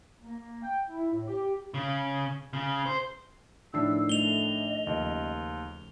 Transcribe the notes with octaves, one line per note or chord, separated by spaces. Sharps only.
A#3
G5
E4
A2
G4
C#3
C#3
C5
A2 D#3 F3 D4 D#4 E6 C7
A3 D#5 F7 G7
D#2 C#3 F3